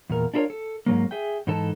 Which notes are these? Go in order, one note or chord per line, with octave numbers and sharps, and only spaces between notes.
E2 A#2 A#4
D4 E4 F4 A4 A#4 C#5
A4
G#2 C3 F#3 A#3
G#4 E5 G5
G#2 E3 D#4 A4 A5